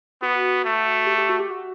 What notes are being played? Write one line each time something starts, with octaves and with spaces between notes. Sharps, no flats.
B3 F#4
A3
G4
G4
F#4
G4
F#4